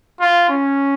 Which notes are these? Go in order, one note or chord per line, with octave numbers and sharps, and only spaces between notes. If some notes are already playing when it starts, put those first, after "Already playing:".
F4
C#4